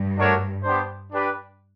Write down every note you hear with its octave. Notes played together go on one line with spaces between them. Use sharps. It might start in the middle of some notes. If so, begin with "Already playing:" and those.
Already playing: G2
A3 D4 F#4 A#4 C#5
B3 D4 G4 C5
D4 G4 B4 D5